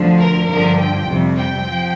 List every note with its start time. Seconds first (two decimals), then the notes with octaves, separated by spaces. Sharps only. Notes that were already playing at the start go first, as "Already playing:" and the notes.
Already playing: D2 D3 F3
0.20 A#4
0.48 G2 D3 F3 A#4
0.78 G5
1.07 F2 C3 G3
1.36 G5
1.65 F3